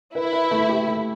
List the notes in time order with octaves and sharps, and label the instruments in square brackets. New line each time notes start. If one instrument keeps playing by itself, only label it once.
[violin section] E4 [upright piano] B4
[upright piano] B4
A3
G4
A3